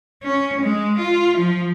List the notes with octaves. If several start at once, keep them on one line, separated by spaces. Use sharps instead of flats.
C#4
G#3
F4
F3